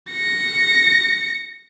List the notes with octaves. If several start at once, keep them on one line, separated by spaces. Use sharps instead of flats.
A#6 C#7